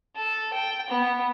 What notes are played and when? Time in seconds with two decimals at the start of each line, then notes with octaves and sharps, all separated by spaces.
0.16 A4
0.53 G5
0.90 B3